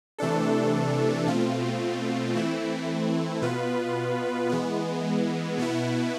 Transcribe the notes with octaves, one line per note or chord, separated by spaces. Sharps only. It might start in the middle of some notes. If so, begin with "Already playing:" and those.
C3 E3 A3 D4 A4
B2 A3 C4 F4
E3 A3 C4 E4
B2 B3 F4 B4
E3 G#3 B3
B2 B3 E4